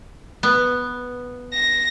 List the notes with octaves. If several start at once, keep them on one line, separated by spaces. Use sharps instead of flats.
B3
A#6